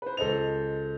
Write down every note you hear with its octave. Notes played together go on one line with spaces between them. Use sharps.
B4 C5
C#2 A4 C5 D#5 F7